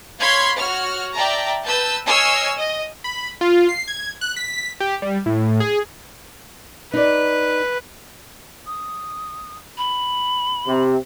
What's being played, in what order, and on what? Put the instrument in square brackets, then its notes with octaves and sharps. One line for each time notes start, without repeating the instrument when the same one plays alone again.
[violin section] C#5 F5 B5 C6 G#6
F#4 C#5 F6
D5 E5 G5 A5 A#5
B4 A5 E6 G6
C#5 D#5 G#5 E6 F6 C7
D#5
[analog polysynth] B5
F4
C7
G#6
F#6
B6
G4
G3
A2
G#4
[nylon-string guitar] D#4 D5 [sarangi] B4
[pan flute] D#6
B5
[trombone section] C3